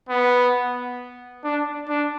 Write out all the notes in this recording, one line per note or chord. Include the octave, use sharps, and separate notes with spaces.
B3
D4
D4